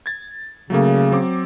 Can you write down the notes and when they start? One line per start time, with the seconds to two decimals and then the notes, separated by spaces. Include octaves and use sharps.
0.06 G#6 A6
0.70 C#3 F#3 A3 A#3
1.11 F#3 C4 D6